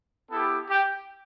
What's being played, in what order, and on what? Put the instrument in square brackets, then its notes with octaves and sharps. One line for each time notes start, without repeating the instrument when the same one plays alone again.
[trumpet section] B3 E4 G4 A4
G4